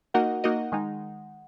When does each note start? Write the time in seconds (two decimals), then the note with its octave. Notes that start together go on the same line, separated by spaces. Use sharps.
0.14 A#3 D#4 F#4 A#4 D#5 F#5
0.44 A#3 D#4 F#4 A#4 D#5
0.72 D#3 G#3 D#4